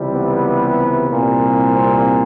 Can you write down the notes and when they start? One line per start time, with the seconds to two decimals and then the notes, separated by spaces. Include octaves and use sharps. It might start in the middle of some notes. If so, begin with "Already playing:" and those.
Already playing: C#2 C3 E3 G3
0.13 B3
1.08 C2 A#2 G3
1.73 C4